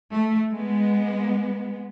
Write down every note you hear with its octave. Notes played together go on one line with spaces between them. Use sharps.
A3
G#3 B3